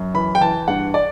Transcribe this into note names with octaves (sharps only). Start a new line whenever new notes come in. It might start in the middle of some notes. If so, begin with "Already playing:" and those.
Already playing: F#2
E3 B5
G5
E3 A5
G2 F#5
D5